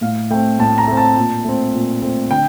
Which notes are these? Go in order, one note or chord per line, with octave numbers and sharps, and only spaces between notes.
A2 F5
A3 C4 G5
A2 A5
A#5
A3 C4
A5
A#2
A3 C4
A#2
A3 C4
D3 G5